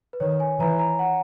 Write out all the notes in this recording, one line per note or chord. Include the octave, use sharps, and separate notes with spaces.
B4
D#3 C#5
G#5
E3 A#5
A#5
F#5